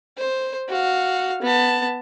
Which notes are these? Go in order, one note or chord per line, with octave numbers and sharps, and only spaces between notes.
C5
F#4 F5
B3 A5